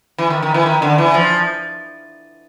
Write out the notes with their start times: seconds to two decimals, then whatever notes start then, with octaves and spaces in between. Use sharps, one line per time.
0.18 E3
0.30 D#3
0.42 D#3
0.54 E3
0.66 D#3
0.82 D3
0.98 E3
1.14 F3